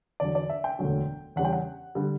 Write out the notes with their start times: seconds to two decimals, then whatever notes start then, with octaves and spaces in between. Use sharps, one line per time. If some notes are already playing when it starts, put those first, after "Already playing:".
0.20 E2 D3 F#3 D5
0.35 D5
0.50 E5
0.64 G5
0.79 E1 D2 D3 F#3
1.36 E2 C#3 G3 F#5
1.45 G5
1.53 F#5
1.95 D3 G3